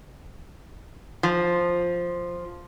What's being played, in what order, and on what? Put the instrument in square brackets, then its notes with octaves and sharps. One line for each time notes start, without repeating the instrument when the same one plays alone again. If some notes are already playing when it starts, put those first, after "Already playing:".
[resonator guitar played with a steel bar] F3